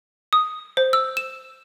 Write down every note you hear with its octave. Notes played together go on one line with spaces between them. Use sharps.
D#6
C5
E6
E7